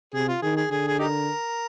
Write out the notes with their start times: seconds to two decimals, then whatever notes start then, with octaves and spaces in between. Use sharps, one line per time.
0.14 C3 G#4
0.28 F4
0.42 D#3 G#4
0.57 G#4
0.71 D3 G#4
0.87 G#4
0.99 D#4 G4 A#4